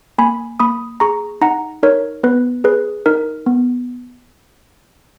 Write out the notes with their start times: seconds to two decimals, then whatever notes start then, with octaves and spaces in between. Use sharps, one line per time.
0.18 A#3 G#5 B5
0.60 A#3 B5 D#6
1.00 G#4 A#5 C#6
1.41 D#4 F#5 A#5
1.83 D#4 A#4 C#5
2.23 B3 B4
2.64 G#4 B4
3.06 D#4 A#4
3.46 B3